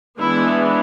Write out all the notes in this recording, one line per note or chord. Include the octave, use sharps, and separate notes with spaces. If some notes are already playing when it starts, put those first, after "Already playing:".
E3 G#3 B3 D4 E4